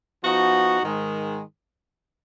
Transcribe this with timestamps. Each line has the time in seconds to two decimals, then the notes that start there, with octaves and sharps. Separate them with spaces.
0.23 F3 B3 D#4 F#4
0.82 G#2 D#3 G#3